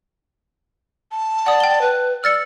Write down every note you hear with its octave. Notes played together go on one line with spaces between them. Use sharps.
A5
D5 F#5 D#6
G5 G7
B4
D5 E6 F6 A6 C#7